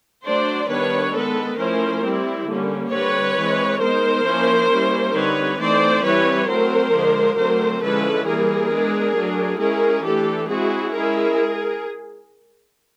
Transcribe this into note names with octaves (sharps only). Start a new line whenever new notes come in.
F#3 A3 D4 C5 D5
D#3 G3 B3 D4 B4 C#5
D#3 G#3 B3 A4 B4
F3 A3 C#4 E4 A#4 C5
G3 C4 E4
D3 G3 A#3 C#4
D3 G3 C4 B4 C#5
E3 G#3 C4
G#3 B3 D#4 A#4 C5
F3 A#3 C#4 E4
G3 A#3 C#4 E4
D3 G3 C4 D#4 B4 C#5
E3 A3 C4 D#4 C5 D5
E3 G3 C4 E4 B4 C#5
F#3 A3 C4 A#4 C5
D3 F3 G#3
D3 F#3 A3 C4 A#4 C5
D3 F3 G#3 C#4 E4 A4 B4
E3 G3 A#3 G#4 A#4
G#3 B3 D4
F#3 A3 D4
G#3 C#4 E4 G#4 A#4
E3 A3 D4 G4 A4
G#3 C4 E4 F#4 G#4
G#3 C#4 E4 G#4 A#4